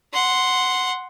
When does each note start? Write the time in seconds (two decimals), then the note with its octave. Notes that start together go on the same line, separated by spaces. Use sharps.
0.13 F#5 C6